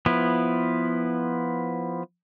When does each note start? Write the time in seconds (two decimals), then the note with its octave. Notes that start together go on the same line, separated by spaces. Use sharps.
0.06 F3 B3 E4